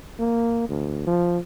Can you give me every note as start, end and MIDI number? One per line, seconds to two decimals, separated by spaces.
0.20 0.68 58
0.69 1.03 38
1.07 1.38 53